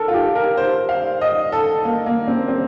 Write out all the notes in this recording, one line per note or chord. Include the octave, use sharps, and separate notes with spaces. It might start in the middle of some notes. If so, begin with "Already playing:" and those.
Already playing: A4 A#4
F4
G4
A#4
C5
F5
D#5
A4
A#3
A#3
C4
C4